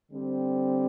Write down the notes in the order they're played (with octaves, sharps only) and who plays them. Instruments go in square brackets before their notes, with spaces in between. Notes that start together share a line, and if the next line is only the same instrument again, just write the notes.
[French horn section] D3 G3 C4